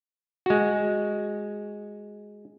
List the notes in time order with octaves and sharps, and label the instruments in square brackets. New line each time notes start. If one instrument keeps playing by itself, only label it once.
[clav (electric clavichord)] G#3 F#4